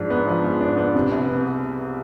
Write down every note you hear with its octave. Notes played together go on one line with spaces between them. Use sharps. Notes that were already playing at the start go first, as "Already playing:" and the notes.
Already playing: G#2 F3 D4
B3
F3
G#2
D4
B3
C3
C2
B3